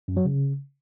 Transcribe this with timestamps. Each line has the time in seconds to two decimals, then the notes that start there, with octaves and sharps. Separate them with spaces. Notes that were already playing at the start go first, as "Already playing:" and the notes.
0.08 F#2
0.17 F#3
0.25 C#3